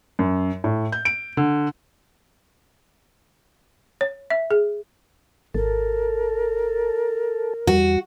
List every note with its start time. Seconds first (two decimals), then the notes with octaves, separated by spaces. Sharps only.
0.19 F#2
0.64 A2
0.92 G6
1.05 D7
1.37 D3
4.01 C#5
4.30 E5
4.51 G#4
5.55 G#1 A4 A#4
7.67 E2 G3 F#4